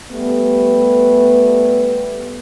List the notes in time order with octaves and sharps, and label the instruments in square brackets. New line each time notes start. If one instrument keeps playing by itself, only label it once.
[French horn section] G3 A3 B3